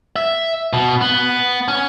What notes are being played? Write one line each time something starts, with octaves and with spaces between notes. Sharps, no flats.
E5
B2
B3
C#4